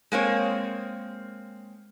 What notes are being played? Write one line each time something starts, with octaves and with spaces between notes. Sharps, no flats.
G#3 A#3 C4 C#5